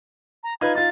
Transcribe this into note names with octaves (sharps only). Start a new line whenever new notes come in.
A#5
D#4 F4 B4 G#6
D#4 F4 A6